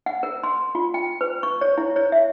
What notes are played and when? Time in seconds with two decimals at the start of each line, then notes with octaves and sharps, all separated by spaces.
0.06 F#5
0.23 A#4
0.44 C6
0.75 F4
0.94 G5
1.21 B4
1.43 C#6
1.61 C#5
1.78 E4
1.96 C#5
2.12 E5